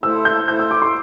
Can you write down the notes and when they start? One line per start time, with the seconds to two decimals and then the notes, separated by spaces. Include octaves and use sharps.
0.03 A3 E4 A4 C5 E6
0.25 G6
0.48 A3 E4 A4 C5 G6
0.59 E6
0.71 D6
0.82 C6